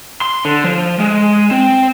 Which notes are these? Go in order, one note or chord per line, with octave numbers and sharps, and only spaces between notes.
C6
D3
F3
G#3
C4